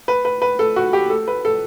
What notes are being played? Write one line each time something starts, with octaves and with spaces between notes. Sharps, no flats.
B4
B4
B4
A4
F#4
G4
A4
B4
A4